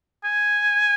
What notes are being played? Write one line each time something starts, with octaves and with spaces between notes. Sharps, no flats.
G#5